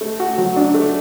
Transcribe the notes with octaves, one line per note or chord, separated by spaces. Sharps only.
A3
F#4
F#3
D4
A3